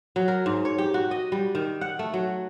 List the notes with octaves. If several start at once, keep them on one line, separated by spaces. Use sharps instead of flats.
F#3
A#4
G#2
C#5
G4
F#4
D#5
G3
D#3
F#5
A3
F#3